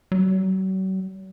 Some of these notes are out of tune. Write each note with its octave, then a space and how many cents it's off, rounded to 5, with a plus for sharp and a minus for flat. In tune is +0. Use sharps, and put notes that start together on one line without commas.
F#3 +40